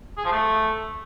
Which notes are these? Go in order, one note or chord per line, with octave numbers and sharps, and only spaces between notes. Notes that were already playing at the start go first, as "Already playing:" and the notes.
G#4
F3
A3